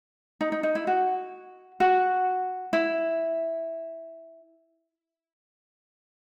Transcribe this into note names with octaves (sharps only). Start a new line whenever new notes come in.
D#4
D#4
D#4
E4
F#4
F#4
E4